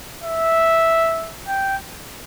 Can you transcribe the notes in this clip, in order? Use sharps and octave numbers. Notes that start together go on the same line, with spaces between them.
E5
G5